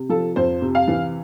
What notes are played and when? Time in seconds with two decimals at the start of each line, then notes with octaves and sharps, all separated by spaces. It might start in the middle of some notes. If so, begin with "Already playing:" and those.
Already playing: C3
0.09 F3 A4
0.36 F2 C5
0.62 C3
0.75 F5
0.88 E3